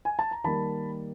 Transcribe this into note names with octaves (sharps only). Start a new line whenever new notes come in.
G#5
A5
A#5
D#3 G3 A#3 A5 B5